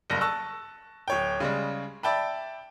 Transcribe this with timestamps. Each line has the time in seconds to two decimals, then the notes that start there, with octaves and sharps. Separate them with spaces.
0.10 F#1 G2 A#6
0.21 A5 C#6 E6 F#6
1.08 D1 C#5 G5
1.40 C#3 G3 G#3
2.03 D5 E5 G5 A5 B5